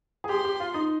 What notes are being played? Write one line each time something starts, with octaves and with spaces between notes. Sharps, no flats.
G#4
G4 C6
G4
F4
D#4